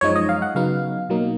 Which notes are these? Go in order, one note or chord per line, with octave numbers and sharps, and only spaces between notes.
F#2 F3 G#3 D#4 C#5
D#5
F5
F#5
C#3 F#3 B3 D#4 F5
B2 F#3 A#3 D#4